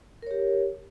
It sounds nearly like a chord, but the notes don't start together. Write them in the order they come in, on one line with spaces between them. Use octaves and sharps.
A#4 C#5 G4